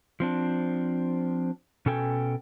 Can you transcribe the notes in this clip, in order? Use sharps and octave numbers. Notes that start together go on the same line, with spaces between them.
F3 C4 D4
B2 C#4 A4 G5 G#5